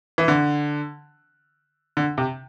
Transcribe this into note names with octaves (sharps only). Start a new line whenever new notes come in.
E3
D3
D3
C3